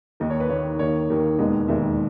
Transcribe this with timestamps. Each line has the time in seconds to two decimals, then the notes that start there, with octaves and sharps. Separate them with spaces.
0.20 D#2 D#3 A#3 D#5
0.30 C#5
0.40 B4
0.50 D#2 D#3 A#3 C#5
0.79 D#2 D#3 A#3 C#5
1.10 D#2 D#3 A#3
1.39 E1 D#2 D#3 G#3 B3 D#5
1.68 E1 D#2 D#3 G#3 B3 E5